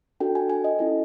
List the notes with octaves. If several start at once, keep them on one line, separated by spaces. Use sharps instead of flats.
D4 F#4 A4 G5
G#5
G#5
D#5
C#4 E4 A4